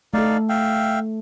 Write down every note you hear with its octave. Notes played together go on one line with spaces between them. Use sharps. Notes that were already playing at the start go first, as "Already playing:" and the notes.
A3 D#4 A4 D5 F5
E5 F5 G5